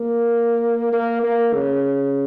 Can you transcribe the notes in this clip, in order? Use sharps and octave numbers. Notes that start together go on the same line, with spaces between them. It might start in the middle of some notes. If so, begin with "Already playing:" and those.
Already playing: A#3
A#3
A#3
C#3